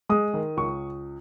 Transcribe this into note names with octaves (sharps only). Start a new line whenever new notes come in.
G#3 D#6
D#3
C#2 C#6